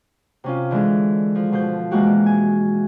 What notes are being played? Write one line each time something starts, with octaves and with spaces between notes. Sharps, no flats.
C3 C#4 F4
D3 E3 G#3 G#4
F3
B2 F3 C5 G6
B2 E3 G#3 A#3 F#4 G4
G#5